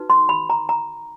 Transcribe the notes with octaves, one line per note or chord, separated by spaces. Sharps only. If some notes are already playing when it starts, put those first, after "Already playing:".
Already playing: D#4 F#4 B4
C6
B5
A#5
A#5